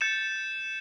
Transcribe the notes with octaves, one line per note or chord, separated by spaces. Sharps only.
G6 A6 C#7 E7